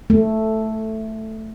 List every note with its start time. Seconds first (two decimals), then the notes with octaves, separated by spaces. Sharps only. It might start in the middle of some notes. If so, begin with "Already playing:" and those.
0.10 A3